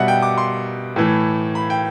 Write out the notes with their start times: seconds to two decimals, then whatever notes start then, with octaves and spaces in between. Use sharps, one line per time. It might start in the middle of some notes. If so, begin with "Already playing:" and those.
Already playing: B2 G3 E5 F#5
0.08 G5
0.23 D6
0.38 C6
0.96 A2 E3 A3
1.55 B5
1.70 G5